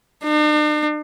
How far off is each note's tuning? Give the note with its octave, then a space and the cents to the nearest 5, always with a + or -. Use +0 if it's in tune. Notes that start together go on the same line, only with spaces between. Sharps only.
D4 +45